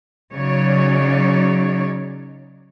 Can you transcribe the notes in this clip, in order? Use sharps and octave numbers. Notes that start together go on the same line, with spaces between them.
C#3 F#3 D#4 C#5 D5